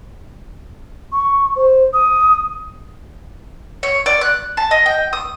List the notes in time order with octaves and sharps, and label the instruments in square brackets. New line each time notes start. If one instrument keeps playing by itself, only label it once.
[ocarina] C#6
C5
D#6
[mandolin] C#5
D5
F#6
A5
D#5
G5
D#6